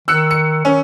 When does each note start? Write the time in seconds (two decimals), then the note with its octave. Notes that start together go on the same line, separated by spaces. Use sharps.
0.08 D#3 E6 F#6 C#7
0.31 C#7
0.65 D#3 C#4